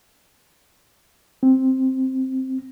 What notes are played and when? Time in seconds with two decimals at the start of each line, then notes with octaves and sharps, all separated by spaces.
1.43 C4